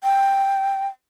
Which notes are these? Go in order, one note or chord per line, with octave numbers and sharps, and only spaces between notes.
G5